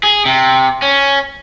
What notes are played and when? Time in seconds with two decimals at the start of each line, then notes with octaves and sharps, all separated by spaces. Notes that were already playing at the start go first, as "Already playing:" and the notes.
0.03 G#4
0.25 C3
0.82 C#4